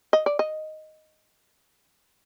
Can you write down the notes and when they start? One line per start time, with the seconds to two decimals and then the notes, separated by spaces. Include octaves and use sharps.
0.13 D#5
0.26 D5
0.39 D#5